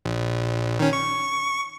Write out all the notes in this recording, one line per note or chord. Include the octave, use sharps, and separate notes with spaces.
A#1
D#3 C#4
C#6